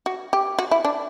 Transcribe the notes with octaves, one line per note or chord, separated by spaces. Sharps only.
F#4
G4
F#4
E4
D4